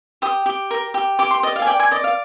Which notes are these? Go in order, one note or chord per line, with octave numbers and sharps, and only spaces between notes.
G4 D#6
G4
A#4
G4
G4 D6
C6
D5 D#5
F5
G#5
D5 G5
G#5
D5 D#5
F5